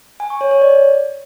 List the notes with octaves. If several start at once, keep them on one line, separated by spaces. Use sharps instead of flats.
G#5
C#6
C#5
C#5
D5